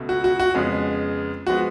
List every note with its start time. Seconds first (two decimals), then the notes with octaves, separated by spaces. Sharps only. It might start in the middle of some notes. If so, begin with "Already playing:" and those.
Already playing: C#2 B2 A3
0.09 F#4
0.24 F#4
0.40 F#4
0.54 F2 C#3 G#3 B3
1.47 F3 G#3 B3 F#4